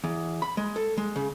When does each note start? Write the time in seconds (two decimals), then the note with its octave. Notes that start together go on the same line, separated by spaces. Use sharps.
0.04 E2
0.42 B5
0.57 G#3
0.76 A4
0.98 G#3
1.16 C#3